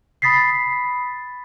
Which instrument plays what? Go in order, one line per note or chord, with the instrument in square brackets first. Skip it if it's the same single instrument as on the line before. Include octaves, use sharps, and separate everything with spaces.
[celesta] B5 D#6 A6 B6 C7